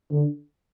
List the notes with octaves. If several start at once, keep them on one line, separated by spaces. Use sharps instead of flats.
D3